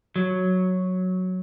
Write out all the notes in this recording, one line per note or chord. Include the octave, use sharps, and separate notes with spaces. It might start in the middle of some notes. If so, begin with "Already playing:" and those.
F#3